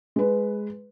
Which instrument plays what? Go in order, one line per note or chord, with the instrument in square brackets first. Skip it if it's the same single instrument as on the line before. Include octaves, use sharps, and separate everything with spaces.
[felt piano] G#3 B4